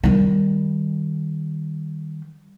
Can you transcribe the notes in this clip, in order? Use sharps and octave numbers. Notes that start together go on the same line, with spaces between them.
D#3 G3